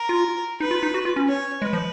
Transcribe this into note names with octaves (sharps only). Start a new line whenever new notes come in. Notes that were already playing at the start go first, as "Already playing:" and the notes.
Already playing: A#4
F4
D#4 B4
F4
D#4
F#4
F4
C#4
C#5
G#3 B4
F3